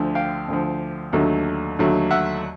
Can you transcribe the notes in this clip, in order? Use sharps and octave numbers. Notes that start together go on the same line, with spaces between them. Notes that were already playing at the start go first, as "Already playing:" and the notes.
Already playing: D2 D3 F3
F5 G5
D2 D3 F3
D#2 D3 F#3 A3
D#2 D3 F#3 A3
E5 F#5